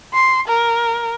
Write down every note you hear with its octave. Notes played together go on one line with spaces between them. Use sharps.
C6
A#4